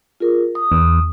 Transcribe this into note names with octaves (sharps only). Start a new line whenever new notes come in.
F4 G#4 A#4
D#6
E2